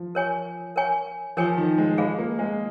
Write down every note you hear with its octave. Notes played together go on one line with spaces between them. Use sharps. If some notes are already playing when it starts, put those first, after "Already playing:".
Already playing: F3
A#4 C#5 G#5 C#6
A#4 C#5 G#5 C#6
F3 A#4 C#5 G#5 C#6
D#3
G#3
G#3 F4 G#4 F5
A#3
G#3